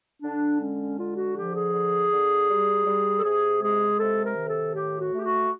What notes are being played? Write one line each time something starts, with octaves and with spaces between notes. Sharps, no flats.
D3 D4
G#3 C#4
D3 F4
F#4
F3 G4
G#4
D3
D3
G3
G3
A4
C3 G#4
G#3 G#4
C3 A4
A#4
D#3
A4
A2 G4
F#4
A3
G4
F#4